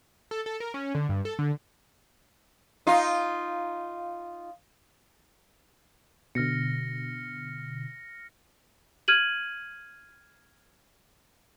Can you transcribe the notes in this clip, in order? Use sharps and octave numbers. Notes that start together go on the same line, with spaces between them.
A4
A4
A#4
C#4
D3
G2
A4
D3
D#4 F4
B2 D3 F6 A#6 C#7
F6 G#6 D#7 F#7